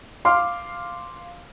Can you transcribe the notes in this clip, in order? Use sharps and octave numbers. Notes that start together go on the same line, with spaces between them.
F5 C6 D6 F6